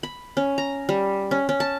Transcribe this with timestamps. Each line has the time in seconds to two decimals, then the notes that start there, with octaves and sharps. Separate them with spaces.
0.03 B5
0.37 C#4
0.58 A#5
0.89 G3
1.31 C#4
1.49 C#4
1.60 A5